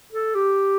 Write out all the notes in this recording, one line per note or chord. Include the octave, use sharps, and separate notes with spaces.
A4
G4